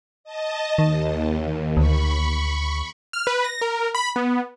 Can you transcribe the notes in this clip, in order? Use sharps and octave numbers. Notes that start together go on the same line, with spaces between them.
D#5 A5
D#2 D#3
D2 B5 C#6
F6
B4
A#6
A#4
B5
B3